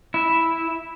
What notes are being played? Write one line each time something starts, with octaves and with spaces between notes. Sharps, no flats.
E4